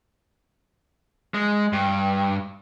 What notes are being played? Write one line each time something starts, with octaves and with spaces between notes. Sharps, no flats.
G#3
G2